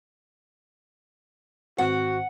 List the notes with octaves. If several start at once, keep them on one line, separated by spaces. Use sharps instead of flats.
G#1 C4 F#4 F#5